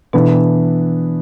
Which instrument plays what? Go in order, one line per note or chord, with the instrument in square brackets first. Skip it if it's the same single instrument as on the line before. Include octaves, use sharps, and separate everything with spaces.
[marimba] B2 [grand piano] E3 B3 D4